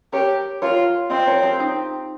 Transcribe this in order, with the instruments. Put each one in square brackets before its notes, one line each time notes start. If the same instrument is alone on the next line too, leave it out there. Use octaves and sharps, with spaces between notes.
[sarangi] G4 [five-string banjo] A#4 C#5
[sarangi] F4 [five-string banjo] A#4 C#5
[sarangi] C4 [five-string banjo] C5 D#5
[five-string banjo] A#4 C#5
G4 A#4
D#4 G4